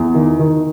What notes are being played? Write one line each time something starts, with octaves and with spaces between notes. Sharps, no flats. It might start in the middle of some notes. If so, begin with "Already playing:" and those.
Already playing: E2
D#3
D#3